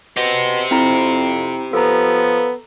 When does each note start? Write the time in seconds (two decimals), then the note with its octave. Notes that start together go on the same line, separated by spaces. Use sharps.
0.17 B2 G4 C5 A#6
0.71 F2 C4 E4 A#5
1.73 F3 B3 A4 A#5